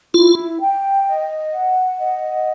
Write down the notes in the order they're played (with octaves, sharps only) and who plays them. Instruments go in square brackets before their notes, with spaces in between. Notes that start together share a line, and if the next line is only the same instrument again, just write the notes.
[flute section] E4 [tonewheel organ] F4
[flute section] G5
D#5
F#5
D#5